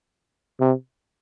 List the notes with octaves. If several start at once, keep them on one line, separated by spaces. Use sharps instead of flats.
C3